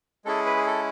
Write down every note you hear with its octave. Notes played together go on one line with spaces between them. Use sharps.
G#3 C#4 E4 G#4 A4
B4
G#4
A4